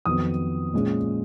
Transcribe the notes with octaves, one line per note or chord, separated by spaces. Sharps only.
F2 D#3 F#3 B3 D#6
A#2 G#3 C#4